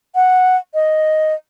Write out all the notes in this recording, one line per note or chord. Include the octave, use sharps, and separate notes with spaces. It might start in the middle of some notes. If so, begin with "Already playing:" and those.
F#5
D#5